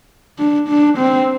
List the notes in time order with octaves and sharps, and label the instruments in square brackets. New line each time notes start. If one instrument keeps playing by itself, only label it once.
[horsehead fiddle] D4
D4
C4